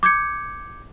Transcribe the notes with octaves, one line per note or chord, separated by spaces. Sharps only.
D6 G6 G#6 C#7